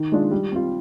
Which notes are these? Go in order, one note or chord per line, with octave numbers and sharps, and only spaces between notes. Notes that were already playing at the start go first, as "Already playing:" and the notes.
Already playing: D#3
G#3 D4 F4
G3
C4 F4